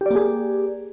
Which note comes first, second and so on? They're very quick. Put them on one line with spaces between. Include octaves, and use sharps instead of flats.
G4 D5 A#3 G#4